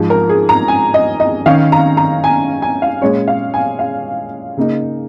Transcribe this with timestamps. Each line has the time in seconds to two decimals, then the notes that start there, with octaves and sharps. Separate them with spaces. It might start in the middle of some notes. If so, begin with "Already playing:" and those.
Already playing: G#2 F3 G#3
0.10 A#4
0.29 G#4
0.49 A#5
0.68 G#5
0.94 D#5
1.20 D#5
1.46 D#3 C#4 F5
1.72 A#5
1.97 A#5
2.24 G#5
2.62 G#5
2.82 F5
3.01 A#2 G#3 C#4 C#5
3.28 F5
3.54 G#5
3.79 F5
4.57 C#3 A#3 D#4